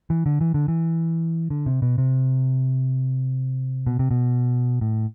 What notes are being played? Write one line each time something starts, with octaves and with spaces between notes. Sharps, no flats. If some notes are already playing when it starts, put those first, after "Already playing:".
E3
D3
E3
D3
E3
D3
C3
B2
C3
B2
C3
B2
A2